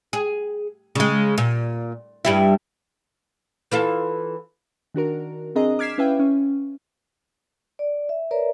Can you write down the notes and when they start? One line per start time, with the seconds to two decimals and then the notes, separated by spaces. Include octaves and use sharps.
0.13 G#4
0.95 C#3 G#3
1.38 A#2
2.25 G2 G3 E4
3.72 E3 F4 A4
4.94 D#3 D4 F#4 A#4
5.55 C4 D4 G#4 D#5 A#5
5.79 D6 F6 G#6 B6 C7 E7
5.98 C#4 E4 B4 E5 F5 G5
6.19 C#4
7.79 D5
8.09 E5
8.31 A#4 B4 C#5 D5 E5 A#5